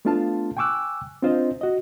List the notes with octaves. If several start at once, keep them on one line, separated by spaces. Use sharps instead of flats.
A3 B3 D4 F4 F5 A5
G5 G#5 C#6 D6 E6 F#6
C4 D4 F4 C5 D#5
F#4 D#5